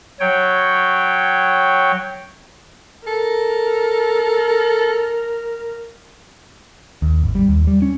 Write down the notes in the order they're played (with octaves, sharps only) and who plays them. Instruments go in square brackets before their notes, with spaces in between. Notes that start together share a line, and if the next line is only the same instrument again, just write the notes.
[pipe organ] F#3 C#5 G5
[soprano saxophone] A4 [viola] A#4
[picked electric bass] D#2
G#1
G3
D#2
G3
C#4